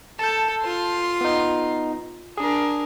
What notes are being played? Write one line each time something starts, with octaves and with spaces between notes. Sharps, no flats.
A4 A5 G6
F4 C6
B3 D#4
D4 G#4 A#4